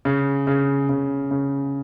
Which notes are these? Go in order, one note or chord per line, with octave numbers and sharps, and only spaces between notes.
C#3
C#3
C#3
C#3